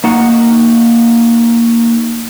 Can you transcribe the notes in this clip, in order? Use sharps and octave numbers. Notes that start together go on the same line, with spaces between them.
A#3 D#4 F#4 F#5